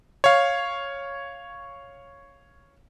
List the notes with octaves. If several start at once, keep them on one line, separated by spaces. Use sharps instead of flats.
C#5 F5